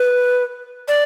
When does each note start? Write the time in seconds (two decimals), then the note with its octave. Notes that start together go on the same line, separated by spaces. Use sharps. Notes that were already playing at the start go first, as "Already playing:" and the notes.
Already playing: B4
0.88 D5